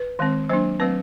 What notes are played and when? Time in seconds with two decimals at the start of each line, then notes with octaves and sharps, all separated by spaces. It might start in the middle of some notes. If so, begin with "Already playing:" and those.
Already playing: B4
0.19 D#3 G#3 C4
0.49 F#3 A#3 D4 C5
0.79 F#3 A3 C4 B4